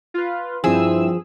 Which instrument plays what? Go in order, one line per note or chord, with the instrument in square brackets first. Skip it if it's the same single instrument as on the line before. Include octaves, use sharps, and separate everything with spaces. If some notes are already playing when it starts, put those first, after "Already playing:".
[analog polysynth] F4 B4
[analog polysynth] G2 C4 E6 [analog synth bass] F3 [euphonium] E4 [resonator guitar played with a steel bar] G#4